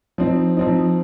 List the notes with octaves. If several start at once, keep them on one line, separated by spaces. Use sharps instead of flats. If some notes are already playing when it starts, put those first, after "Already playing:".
F3 C4 D#4
F3 C4 D#4